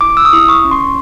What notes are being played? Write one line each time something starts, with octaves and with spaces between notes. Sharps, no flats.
E4 D6
E6
D#6
E4
C#6
C#4
C6